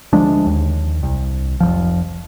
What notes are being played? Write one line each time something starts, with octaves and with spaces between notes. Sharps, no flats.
D2 F3 G#3 D4
D#2
C2
F1 C2 F3